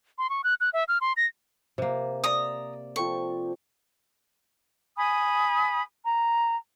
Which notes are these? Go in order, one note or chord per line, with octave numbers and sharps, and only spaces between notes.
C6
C#6
F#6
F#6
E5
F6
C6
A#6
C3 A#3
D5 A#5 D#6 E6
F3 C4 A4 C#6
G#5 B5 D#6
A#5